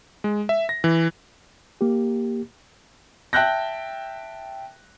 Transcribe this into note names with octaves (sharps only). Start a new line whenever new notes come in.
G#3
E5
A#6
E3
A#3 G4
E5 G5 A5 F#6 G6 A#6